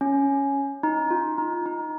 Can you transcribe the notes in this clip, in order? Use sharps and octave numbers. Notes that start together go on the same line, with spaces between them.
C#4
D#4
F4
D#4
D#4